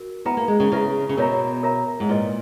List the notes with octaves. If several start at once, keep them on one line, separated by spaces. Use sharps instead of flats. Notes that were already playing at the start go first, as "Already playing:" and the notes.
Already playing: F#4 A#4
B3 E4 B4 E5 A#5
A#3
G#3
C#3
C#3 E4 B4 E5 A#5
C#3
B2 A#4 C#5 E5 A#5
A#4 C#5 E5 A#5
G#2
A#2 E4 B4 D#5